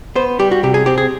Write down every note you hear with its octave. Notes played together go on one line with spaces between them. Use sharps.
B3 C5
G3 G4
F#4
C3 G4
G#4
C4 G4
G#4